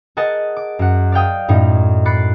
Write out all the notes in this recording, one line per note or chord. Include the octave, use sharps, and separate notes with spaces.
G#4 A#4 D#5 F#5 G#5 A5
D6
F#2 F#5
D5 F5 G5 D#6
F#2 A2 D#4
B5 D6 F#6 A6 C7 C#7